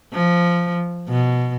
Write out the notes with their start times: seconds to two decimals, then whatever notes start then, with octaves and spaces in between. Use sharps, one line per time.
0.13 F3
1.08 B2